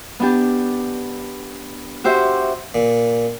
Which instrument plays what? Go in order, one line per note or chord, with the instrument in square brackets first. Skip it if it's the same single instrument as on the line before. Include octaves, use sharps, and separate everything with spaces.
[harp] B3 D4 G4
F#4 G4 C5 E5
[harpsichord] A#2